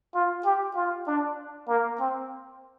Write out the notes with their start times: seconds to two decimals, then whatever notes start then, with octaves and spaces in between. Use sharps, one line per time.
0.15 F4
0.45 G4
0.76 F4
1.07 D4
1.68 A#3
2.00 C4